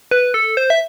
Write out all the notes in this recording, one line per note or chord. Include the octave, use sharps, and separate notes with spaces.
B4
A4
C5
E5